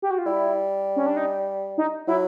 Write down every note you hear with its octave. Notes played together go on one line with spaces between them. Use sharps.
G4
F#4
F4
G3 E4
C#4
D4
D#4
D#4
F#3 E4